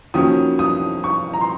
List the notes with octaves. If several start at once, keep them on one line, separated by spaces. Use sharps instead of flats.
F2 D#3 F#3 A#3 C#4 D#6
D#6
C#6
A#5
C6